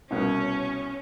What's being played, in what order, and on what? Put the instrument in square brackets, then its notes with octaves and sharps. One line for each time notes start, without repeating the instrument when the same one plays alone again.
[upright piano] C2 B2 [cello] C#4